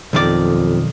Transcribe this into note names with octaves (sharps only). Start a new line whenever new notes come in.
B1 F2 D#3 D5